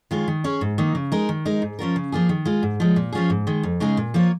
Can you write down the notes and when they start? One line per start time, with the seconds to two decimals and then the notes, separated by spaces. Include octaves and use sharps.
0.11 D#3 G#3 F4 C#5
0.28 D#3
0.44 C#4 G#4 C#5
0.61 G#2
0.78 D#3 A#3 D#4
0.95 C#3
1.12 G#3 D#4 A#4
1.29 D#3
1.45 G#3 D#4 A#4
1.62 G#2
1.79 F3 C#4 F4 A#4
1.96 C#3
2.12 F3 A#3 F4 G#4
2.29 D#3
2.45 G#3 F4
2.63 G#2
2.80 F3 G#3
2.96 A#2
3.13 F3 C#4 F4 G#4
3.30 G#2
3.47 D#3 G#3
3.63 F2
3.80 C#3 G#3 D#4 G#4
3.97 A#2
4.14 F3 A#3 F4 C#5